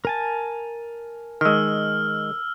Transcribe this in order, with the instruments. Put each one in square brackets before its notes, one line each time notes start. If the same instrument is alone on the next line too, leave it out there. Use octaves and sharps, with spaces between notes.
[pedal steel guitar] A#4 G#5 A5
[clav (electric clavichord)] D#3 G#3 [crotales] E6 F6